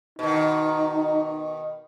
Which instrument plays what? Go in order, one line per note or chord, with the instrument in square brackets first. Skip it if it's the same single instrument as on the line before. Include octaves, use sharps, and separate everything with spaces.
[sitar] B2 D#3 [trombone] D#4